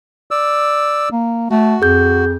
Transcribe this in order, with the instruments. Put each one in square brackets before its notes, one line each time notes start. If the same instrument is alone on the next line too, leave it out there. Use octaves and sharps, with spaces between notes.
[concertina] D5 E6
[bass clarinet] A#3
[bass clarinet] A3 [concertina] F#4
[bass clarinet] F2 [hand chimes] G#4 G6